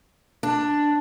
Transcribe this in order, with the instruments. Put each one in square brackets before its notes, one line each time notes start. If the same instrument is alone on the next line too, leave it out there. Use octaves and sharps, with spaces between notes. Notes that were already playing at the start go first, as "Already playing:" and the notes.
[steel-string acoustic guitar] D4